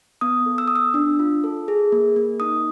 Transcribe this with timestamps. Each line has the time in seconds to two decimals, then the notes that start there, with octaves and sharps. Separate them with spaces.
0.21 B3 D#6
0.46 A4
0.58 E6
0.68 B3 D#6
0.76 E6
0.94 D4
1.19 F4
1.44 A4
1.68 G#4
1.92 A#3
2.16 A#3
2.40 D#4 D#6